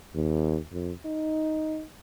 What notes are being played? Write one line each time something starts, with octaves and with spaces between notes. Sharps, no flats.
D#2
F2
D#4